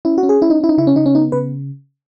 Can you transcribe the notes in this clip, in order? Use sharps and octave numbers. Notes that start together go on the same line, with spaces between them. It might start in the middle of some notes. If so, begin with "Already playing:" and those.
C#4 E4
F#4
C#4
G#4
C#4 E4
D#4
C#4 E4
D#4
C#3 E4
C#4
C#3 D#4
C#4
B3 D#4
C#3 B4